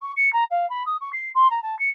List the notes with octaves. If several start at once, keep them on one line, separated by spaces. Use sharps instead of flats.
C#6
C#7
A#5
F5
B5
D#6
C#6
C7
C6
A#5
A5
C#7